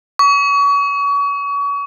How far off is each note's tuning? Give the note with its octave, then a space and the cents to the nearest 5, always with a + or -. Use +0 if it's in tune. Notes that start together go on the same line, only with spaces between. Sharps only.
C#6 +35